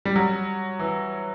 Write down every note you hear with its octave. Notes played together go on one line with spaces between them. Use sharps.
G3
F#3
E3